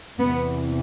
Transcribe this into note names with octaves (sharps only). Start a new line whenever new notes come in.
E2 C3 E3 B3